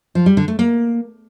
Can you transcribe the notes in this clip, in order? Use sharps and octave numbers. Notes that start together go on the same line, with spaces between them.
F3
G3
D3
A3
A#3